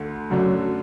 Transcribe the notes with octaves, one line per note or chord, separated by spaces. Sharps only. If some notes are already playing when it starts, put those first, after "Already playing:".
Already playing: D2 D3 A3
F#2 D3 F#3 A3 D4